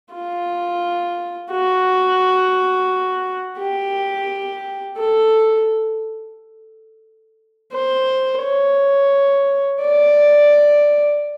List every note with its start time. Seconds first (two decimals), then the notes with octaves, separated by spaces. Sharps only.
0.13 F4
1.51 F#4
3.58 G4
4.97 A4
7.73 C5
8.43 C#5
9.80 D5